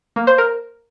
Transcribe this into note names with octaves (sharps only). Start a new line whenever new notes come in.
A#3
C5
A#4